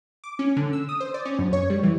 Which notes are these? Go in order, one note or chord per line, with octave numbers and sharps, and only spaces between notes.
D6
C#4
D3
E6
D#6
C5
D5
C#4
F#2
C#5
G3
E3